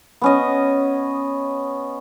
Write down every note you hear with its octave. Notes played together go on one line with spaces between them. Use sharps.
B3 C#4 D#5